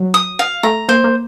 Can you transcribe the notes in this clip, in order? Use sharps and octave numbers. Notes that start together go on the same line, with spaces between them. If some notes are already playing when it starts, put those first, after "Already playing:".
Already playing: F#3
D#6
F5
A3 A#5
A#3 C5
A#3